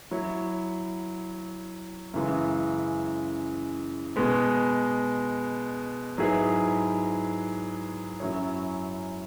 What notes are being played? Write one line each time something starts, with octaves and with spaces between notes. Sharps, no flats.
F#3 E4 C#5
F#2 C#3 E3 G#3
B2 G#3 B3
G#2 F#3 E4 G#4 B4
F#2 F#3 C#4 E4 C#5